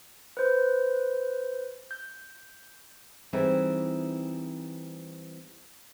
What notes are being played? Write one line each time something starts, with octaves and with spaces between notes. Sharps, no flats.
B4 C5
G6
E3 G3 C4 D#4 E4 G#4